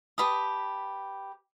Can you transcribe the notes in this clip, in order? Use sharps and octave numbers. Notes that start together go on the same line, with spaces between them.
G4 B4 A5 D#6